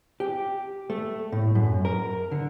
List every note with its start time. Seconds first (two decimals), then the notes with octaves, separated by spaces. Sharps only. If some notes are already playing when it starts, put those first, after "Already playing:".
0.20 G4
0.90 A3
1.32 A2
1.55 F#2
1.85 A#4
2.32 D3